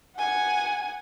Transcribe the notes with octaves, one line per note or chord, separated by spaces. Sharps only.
F#5 G#5